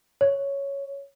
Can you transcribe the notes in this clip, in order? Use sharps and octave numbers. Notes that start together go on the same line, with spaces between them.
C#5